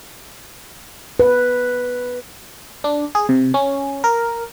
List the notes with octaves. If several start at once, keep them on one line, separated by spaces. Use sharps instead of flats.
B4
D4
G#4
C3
C#4
A#4